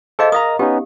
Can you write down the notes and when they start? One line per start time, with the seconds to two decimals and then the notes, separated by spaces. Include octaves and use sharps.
0.19 G#4 A4 C5 D#5 F5 A5
0.32 A#4 D#5 F5 A#5 D#6
0.59 B3 C#4 D#4 G4